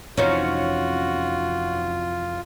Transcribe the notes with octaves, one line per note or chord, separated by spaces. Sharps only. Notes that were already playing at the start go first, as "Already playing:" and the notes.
F2 C3 E3 C#4 D#4 F4 F#4 C5